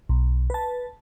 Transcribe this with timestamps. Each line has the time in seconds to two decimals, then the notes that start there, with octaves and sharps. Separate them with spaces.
0.09 B1
0.50 B4 A5